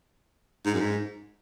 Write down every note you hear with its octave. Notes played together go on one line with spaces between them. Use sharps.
G#2
F#2
G#2